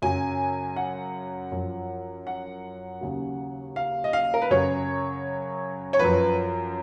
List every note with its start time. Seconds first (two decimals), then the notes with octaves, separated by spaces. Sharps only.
0.02 F#2 C#3 F#3 G#5
0.76 F#5
1.52 F#2 F3
2.27 F#5
3.01 D#2 C#3 F#3
3.76 F5
4.04 D#5
4.13 F5
4.34 A#4
4.42 B4
4.50 F#2 C#3 F#3 C#5
5.93 C#5
5.99 F#2 F3 B4